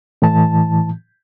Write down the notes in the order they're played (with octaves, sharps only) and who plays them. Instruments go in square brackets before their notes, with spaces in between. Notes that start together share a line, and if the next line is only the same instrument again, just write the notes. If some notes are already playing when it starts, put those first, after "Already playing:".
[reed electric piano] A2 E3 A5